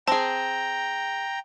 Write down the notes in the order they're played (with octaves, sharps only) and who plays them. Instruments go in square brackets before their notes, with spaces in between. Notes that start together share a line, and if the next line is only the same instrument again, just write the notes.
[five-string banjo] C4 G#4 [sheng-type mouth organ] G5 A#5 [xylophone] A5